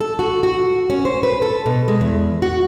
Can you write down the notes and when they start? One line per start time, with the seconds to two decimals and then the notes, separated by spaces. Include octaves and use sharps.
0.01 A4
0.19 F#4
0.43 F#4
0.90 C#4
1.05 C5
1.23 B4
1.42 A4
1.66 B2
1.88 G#3
2.01 E2
2.42 F#4